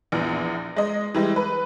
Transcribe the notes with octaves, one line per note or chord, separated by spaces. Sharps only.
A#1 E2
G#3 D#5
E3 G3 G#3
B4